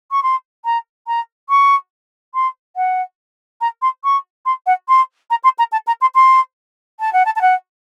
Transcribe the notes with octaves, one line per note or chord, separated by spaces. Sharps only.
C#6
C6
A#5
A#5
C#6
C6
F#5
A#5
C6
C#6
C6
F#5
C6
A#5
C6
A#5
A5
A#5
C6
C6
A5
F#5
A5
A5
F#5